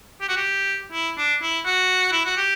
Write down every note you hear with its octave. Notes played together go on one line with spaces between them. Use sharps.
G4
F#4
G4
E4
D4
E4
F#4
E4
F#4
G4